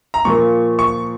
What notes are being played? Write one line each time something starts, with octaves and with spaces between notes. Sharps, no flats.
A#5
A#2 F3 A#3 C#6
C#6